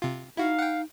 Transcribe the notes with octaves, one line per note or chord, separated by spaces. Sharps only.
C3 F4
D#4 E4 F#4 F5
F#5 G5